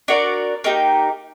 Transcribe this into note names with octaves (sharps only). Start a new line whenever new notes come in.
D4 F#4 A#4 D5
A#3 D#4 G4